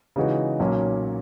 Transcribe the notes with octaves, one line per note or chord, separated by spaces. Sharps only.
C#3 E3 G#3 D#4 F#4
B1 A#2 F#3 A#3 C#4